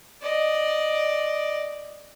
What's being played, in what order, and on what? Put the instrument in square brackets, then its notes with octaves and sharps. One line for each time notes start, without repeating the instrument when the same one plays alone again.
[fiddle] D5 D#5